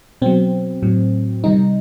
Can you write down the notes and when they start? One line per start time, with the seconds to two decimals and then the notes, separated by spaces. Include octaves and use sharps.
0.22 B2 F#3 C4
0.83 A2 F#3
1.44 C3 D#3 G3 D#4